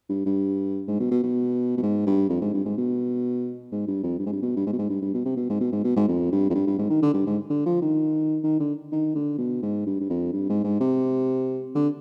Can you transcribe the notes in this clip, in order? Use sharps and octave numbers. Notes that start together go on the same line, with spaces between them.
G2
G2
G#2
B2
B2
B2
B2
G#2
G2
F2
G#2
G2
G#2
B2
G#2
G2
F2
G2
G#2
G2
B2
G2
G#2
B2
G#2
G2
G2
B2
C3
B2
G#2
B2
G#2
B2
G#2
F2
G2
F2
G2
G2
G#2
D#3
D3
G2
G#2
D3
F3
D#3
D#3
D3
D#3
D3
B2
G#2
G2
G2
F2
G2
G#2
G#2
C3
D3